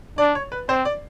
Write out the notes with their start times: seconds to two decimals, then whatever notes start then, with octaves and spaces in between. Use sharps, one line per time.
0.18 D4 D5
0.35 C#5
0.52 B4
0.69 C4 C5
0.85 D5